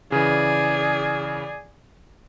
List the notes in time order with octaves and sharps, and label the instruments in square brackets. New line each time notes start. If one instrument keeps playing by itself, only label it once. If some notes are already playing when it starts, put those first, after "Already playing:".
[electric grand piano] C#3 E3 [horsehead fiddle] G#4 D5